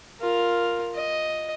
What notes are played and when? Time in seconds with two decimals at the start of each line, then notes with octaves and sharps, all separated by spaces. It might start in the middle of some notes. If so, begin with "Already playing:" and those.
0.20 F4 A#4
0.95 D#5